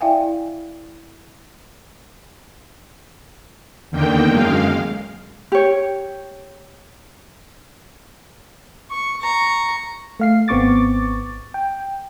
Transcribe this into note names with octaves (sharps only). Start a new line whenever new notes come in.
E4 D5 E5 F5 G5 G#5
E2 D3 D#3 A#3 G5
F#2 G#3 F5
G4 C#5
C#6
A#5 C#6
A3 F5 C7
G#1 B3 C4 C#6 D6 A6
G5